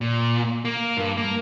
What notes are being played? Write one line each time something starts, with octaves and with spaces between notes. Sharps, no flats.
A#2
A#3
G2
A#3